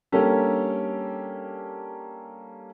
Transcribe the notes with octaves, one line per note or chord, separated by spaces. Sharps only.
G3 A#3 C#4 D4 G4 A4